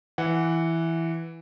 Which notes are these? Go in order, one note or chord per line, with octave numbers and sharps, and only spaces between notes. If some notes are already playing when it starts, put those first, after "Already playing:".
E3 F#5